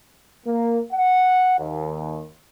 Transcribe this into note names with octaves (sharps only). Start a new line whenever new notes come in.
A#3
F#5
D#2